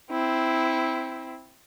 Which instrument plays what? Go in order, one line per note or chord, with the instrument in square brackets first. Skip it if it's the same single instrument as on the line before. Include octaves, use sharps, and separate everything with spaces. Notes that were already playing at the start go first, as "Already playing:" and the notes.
[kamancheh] C4 E4